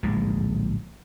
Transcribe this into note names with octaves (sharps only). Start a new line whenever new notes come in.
D1 A#1 G#2 G#3